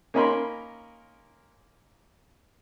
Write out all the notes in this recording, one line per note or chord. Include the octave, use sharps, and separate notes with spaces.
A#3 C#4 D#4 A#4 B5 C6